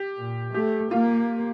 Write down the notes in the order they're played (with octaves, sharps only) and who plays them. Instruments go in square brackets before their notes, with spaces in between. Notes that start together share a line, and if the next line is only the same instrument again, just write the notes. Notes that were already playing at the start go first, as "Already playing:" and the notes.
Already playing: [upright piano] G4
[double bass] A#2
[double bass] A3 [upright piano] G4
[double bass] A#3 [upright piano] F4